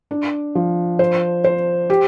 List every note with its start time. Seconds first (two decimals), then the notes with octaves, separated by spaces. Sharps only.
0.11 D4
0.55 F3
0.99 C5
1.44 C5
1.90 G4